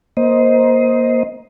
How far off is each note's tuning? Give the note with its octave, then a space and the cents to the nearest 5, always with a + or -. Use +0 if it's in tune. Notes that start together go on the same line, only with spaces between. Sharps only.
A#3 +20 C5 +0 D#5 +15